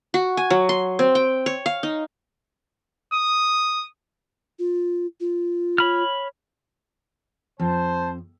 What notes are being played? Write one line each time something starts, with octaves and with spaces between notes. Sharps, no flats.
F#4
G#5
F#3
C6
C4
G5
C#5
F5
D#4
D#6
F4
F4
C#5 B5 F6
F2 C5 A5